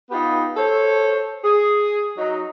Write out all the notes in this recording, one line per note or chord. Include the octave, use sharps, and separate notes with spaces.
B3 D#4 F4 G4 B4
A4 C5 C#5
G#4
F#3 D#4